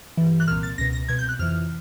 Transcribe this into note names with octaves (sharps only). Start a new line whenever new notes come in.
G2 E3
F#6
C2 A#2 F6
A6
C#2 B2 A#6
A#6
C2 B2 G#6
G6
F#6
F2 C3 E3 F6